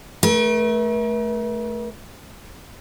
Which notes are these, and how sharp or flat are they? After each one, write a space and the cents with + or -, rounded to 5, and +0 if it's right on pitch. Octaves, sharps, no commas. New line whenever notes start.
A3 -15 A#4 +45